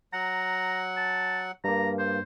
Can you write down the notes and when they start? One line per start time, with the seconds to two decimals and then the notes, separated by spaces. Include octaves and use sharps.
0.13 F#3 F#5 A#5
0.97 A5
1.64 G2 A#3 A#5
1.98 C5